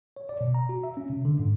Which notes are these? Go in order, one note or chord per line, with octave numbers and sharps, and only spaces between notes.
C#5
D5
B2
A#5
F#4
E5
C#4
C3
D3
G#2